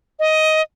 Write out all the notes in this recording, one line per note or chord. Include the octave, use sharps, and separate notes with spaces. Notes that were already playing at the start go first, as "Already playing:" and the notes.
D#5